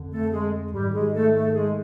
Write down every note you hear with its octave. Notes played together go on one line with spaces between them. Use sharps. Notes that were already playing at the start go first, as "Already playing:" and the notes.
Already playing: F2 D3
A3 A4
G#3 G#4
G#2 D#3 G3 G4
G#3 G#4
A3 A4
A3 A4
G#3 G#4